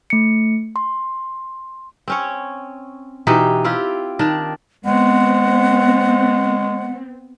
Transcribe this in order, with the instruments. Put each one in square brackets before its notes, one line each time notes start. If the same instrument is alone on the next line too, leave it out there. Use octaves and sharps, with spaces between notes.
[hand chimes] A3 C#7
C6
[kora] C4 C#4 C#5
B2 E3 D#4 G4
C4 E4 F4 G4
D#3 D4 D5
[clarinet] G#3 [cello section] B3 C4 [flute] F#5